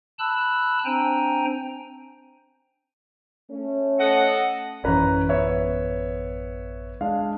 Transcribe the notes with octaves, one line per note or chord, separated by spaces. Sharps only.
A5 B5 E6 F#6
C4 D4 C5 G5 G#5 A#5
A3 C#4
A4 D#5 F#5
A1 F#2 E3 C#4 B4 A#5
B3 C#5 E5
G#3 D4 F5